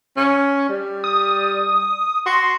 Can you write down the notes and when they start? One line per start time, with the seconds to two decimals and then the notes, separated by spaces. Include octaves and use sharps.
0.17 C#4
0.69 G3
1.04 D#6
2.26 F#4 C6